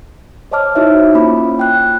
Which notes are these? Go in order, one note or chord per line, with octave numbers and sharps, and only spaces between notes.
C5 C#5 D#5 A5 D6 F6
D#4 E4 F#4 C5 C#5 E5
A#3 C#4 F4 B5 D6
G5 F#6